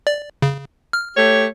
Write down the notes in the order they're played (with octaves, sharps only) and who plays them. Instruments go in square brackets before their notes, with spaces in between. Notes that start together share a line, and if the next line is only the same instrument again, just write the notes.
[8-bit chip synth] D5
C#3
F6
[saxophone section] A3 G4 C#5